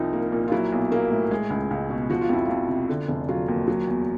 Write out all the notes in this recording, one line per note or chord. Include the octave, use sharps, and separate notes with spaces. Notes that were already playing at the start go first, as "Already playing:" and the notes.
Already playing: C2 F3 D#4
A#3
A#2
F4
F#3 E4
B1
A#3
A2
G#3
C#2
C#2
B2
F3 F#4
F4
F2 E4
F2 F4
C3
D3
F1
F#3 F4
D#2
F#3
E2